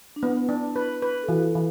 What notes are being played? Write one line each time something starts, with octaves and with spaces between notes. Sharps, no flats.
D4
B3 E4
D4
B4
B4
A4
E3 F#4
A4
E3